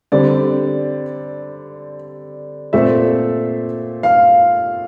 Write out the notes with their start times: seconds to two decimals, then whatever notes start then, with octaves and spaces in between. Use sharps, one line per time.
0.12 D3 G3 C4 D5
2.73 A#2 A3 C4 E5
4.03 F5